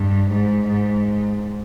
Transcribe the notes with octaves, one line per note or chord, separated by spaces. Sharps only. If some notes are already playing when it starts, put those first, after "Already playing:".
Already playing: G2
G#2
G#2